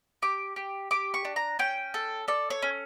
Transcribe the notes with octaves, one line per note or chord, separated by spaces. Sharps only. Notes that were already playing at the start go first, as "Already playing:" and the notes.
G4 D6
G4
G4 D6
C#6
D4
A#5
C#4 G5
A4
A4 D5
C#5
C#4